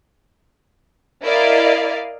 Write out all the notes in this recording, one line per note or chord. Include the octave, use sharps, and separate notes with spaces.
E4 A#4 D5 D#5 F5